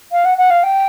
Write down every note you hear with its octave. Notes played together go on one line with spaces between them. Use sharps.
F5
F#5
F#5
F5
G5